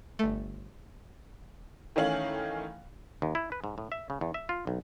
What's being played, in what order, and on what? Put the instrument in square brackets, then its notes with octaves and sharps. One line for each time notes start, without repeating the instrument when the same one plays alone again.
[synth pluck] G1 A3
[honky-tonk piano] D#3 E3 A3 C#4 F5 F#7
[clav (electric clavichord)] D#2
E4
B4
G#2
A2
E5
C#3
E2
E5
F4
B1